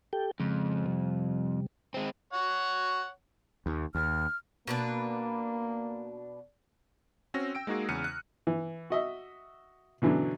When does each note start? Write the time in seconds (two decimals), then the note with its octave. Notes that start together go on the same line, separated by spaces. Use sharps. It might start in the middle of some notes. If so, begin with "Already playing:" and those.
0.13 G4 A4 G5
0.40 F2 C#3 G#3
0.86 C3 G3
1.94 G#3 C4
2.33 C#5 F#5
3.66 D#2
3.95 D#2 F6
4.67 B2 A#3 D4 B4
7.34 C4 C#4 F#4 E6 A#6
7.55 G5 E6 D7
7.67 G#3 A#3 D#4 F#4 G#4
7.89 E2 C#3 F6 F#6 C#7 D#7
8.04 F#6
8.47 E3
8.90 F#4 D#5 E5
10.02 B2 D3 E3 F#3 C#4 D4